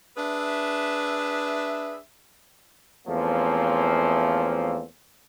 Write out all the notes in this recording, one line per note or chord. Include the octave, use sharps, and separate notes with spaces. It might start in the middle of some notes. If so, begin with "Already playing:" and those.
D4 G#4 B4 E5
E2 F3 A3 A#3 C4 C#4